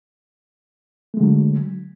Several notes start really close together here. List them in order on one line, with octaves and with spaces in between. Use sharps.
A3 G#3 D3 F#3